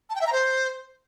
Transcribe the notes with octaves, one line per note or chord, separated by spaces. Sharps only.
A5
G5
E5
A#5
C5